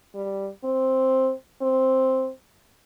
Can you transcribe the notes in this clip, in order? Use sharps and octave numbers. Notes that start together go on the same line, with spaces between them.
G3
C4
C4